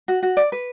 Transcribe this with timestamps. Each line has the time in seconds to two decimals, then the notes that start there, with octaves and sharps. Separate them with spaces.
0.08 F#4
0.23 F#4
0.37 D5
0.52 B4